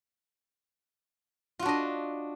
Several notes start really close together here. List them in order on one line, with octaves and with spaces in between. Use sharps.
F4 F#4 D4 D#5